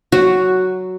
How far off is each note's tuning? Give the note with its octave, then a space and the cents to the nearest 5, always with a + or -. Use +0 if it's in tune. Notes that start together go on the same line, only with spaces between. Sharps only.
F#3 +10 F#4 +0